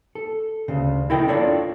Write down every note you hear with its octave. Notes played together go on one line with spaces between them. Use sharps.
A4
D2 C#3
E4 A4 A#4 D#5 E5 G5
D4 F4 A4 C#5 D5